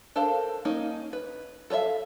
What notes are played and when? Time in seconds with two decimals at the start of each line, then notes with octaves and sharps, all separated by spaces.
0.16 D4 A4 A#4 C5 F5
0.65 A#3 C#4 D#4 D#5
1.13 B4
1.70 A4 B4 C#5 E5 F5